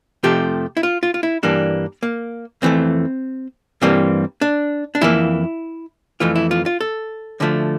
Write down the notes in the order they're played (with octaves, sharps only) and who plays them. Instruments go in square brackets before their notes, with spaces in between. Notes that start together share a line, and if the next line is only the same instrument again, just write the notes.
[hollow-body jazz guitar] F2 C3 F3 A3 G4
E4
F4
F4
F4
E4
G2 E3 G3 A#3 D4
A#3
F2 E3 A3 C4
G2 E3 G3 A#3 C4
D4
D4
F2 E3 A#3 E4
F2 E3 A3 F4
E4
F4
F4
A4
D2 D3 F3 A3